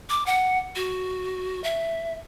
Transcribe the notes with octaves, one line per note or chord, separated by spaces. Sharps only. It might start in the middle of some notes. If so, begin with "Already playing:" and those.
D6
F#5
F#4
E5